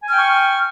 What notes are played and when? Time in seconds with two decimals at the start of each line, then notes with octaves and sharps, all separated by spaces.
0.03 G#5
0.08 F6
0.13 G5
0.17 C#6